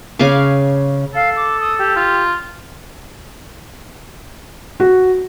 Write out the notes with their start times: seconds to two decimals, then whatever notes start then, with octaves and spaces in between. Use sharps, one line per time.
0.19 C#3 F5 G#5 D6
1.14 A4 F5
1.36 D6
1.60 D#6
1.78 G4
1.96 F4
4.80 F#4